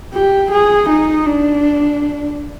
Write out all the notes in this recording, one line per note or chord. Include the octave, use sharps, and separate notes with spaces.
G4
G#4
D#4
D4